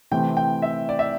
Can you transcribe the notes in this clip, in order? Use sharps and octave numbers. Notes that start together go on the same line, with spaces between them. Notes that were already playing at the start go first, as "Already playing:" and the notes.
C3 E3 A3 C4 G5
G5
E5
D5
E5